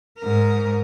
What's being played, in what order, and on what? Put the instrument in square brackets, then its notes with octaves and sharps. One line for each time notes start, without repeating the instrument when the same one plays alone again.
[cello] G#2 A#4